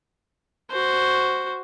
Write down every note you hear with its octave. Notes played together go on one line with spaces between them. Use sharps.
F#4 C5